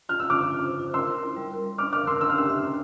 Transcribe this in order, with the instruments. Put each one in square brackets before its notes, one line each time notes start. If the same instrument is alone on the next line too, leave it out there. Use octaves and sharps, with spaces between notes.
[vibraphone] F4 [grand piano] F6
[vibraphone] F4 [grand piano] E6
[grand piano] D6 F6
[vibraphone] F4
F4
C5
F4
[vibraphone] A#4 [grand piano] C6 E6
[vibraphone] A#4
E4
G3
A#4
A#4
[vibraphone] D4 [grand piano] D6 F6
[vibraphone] A#4 [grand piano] D6 F6
[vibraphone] A#4 [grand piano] C6 E6
[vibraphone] D4 [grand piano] E6
[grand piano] F6
[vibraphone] G4 [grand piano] C6 E6
[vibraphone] E5
D4